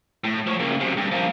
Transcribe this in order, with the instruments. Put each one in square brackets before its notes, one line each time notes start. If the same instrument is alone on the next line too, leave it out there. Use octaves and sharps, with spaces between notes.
[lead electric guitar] A2
F3 C#5
C#3 A#3
F#2 C3
G2
F3 A#3